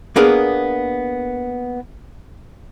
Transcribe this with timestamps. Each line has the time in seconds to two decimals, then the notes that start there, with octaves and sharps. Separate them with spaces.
0.16 A#3 B3 D4 G#4 A#4